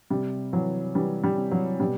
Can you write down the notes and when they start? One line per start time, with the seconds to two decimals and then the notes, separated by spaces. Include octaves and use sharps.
0.10 C3 G3
0.53 E3 F#3
0.95 E3 G3
1.24 G3
1.37 C3
1.52 F#3
1.80 B2 G3